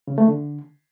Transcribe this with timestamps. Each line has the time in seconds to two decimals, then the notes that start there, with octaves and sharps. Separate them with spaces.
0.07 C#3
0.18 A3
0.28 D3